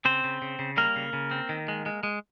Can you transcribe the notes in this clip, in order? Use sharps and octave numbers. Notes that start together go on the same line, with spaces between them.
C#3 C4 C5
C#3
C#3
C#3
G3 A#3 A#4
C#3
C#3
C4
D#3
G#3
G#3
G#3